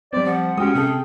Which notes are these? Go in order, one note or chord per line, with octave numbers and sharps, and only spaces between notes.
G3 C4 D5
F3 F#5
G#3 C#4 F#4 G4 G5 D#6
C3 G#4 A4